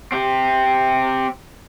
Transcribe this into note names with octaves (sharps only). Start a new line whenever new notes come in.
C4 G4